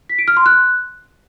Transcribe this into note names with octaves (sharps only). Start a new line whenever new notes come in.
B6
D7
F6
C6
F#6